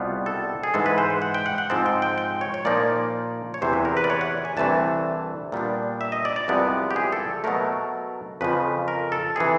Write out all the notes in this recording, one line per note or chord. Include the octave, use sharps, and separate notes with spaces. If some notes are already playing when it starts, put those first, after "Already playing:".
Already playing: C2 B2 G3 B3 F4
A4
G#4
G#2 E3 G#3 A4
B4
C5
F#5
F#5
G5
F#5
F#5
G#2 F3 G#3 C4 A5
G5
G5
G5
C#5
C#5
A#2 F3 A#3 D#4 D5
C#5
E2 C3 E3 C5
B4
A#4
B4
D5
C#5
F#5
G#5
C2 C3 E3 A3 D4 A5
A#2 G3 B3 D4
E5
D#5
D5
D5
C2 C3 F3 G#3 B3
G4
G#4
A4
B2 F#3 A3 A#4
F2 C#3 F3 B4
A#4
A4
C3 E3 G#4